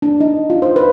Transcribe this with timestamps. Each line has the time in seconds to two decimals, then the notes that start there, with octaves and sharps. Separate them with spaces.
0.02 D4
0.20 D#4
0.50 F4
0.62 C5
0.76 B4